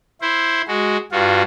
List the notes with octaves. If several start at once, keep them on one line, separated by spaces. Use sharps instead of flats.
E4 C5
G#3 F#4
G2 F4 F#4